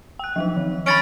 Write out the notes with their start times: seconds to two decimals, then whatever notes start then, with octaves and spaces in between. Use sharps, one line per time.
0.19 G5 F#6
0.36 F3 F#3 D#4
0.56 D#3
0.86 C#4 B5 A6 D7